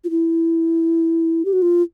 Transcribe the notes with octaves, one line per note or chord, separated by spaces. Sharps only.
F4
E4
G4
F#4
F4